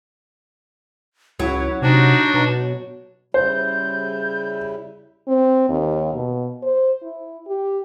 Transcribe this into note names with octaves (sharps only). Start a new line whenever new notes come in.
C#2 F#3 E4
C3 D4 D#4 F#4
B2
C#3 G3 E4 C5 G6
C4
D#2
B2
C5
E4
G4